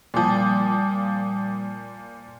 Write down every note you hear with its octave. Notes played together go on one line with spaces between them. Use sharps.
A#2 F3 G3 D6 D#6